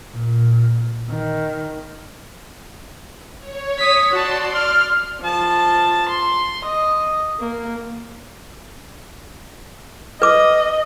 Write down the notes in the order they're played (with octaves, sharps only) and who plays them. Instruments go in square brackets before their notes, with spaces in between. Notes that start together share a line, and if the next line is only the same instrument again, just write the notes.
[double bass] A#2
D#3
[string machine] C#5
[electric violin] D#6 B6
[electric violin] F#4 A5 [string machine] D5 C6
[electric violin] F6
[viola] F3 A5
C6
D#5
A#3
[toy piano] B4 D6 [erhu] D#5